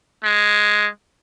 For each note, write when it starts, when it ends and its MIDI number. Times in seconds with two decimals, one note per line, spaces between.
0.24 0.87 56